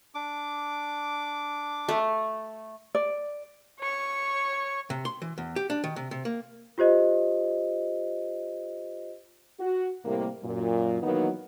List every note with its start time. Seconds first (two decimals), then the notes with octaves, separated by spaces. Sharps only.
0.15 D4 D6
1.89 A3
2.95 D5
3.80 C#5 C#6
4.90 C3
5.05 C6
5.22 E3
5.38 E2
5.56 G4
5.70 D4
5.84 D#3
5.96 C3
6.11 C3
6.25 A#3
6.78 F4 G4 C5 D#5
9.59 F#4
10.05 A2 C3 G3 A#3
10.43 F#2 A#2
11.02 D#3 E3 F#3 A#3 B3 D#4